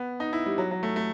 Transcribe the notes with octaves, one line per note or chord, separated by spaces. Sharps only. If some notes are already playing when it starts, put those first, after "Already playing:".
Already playing: B3
D#4
E4
G3
F#3
F#3
A3
A3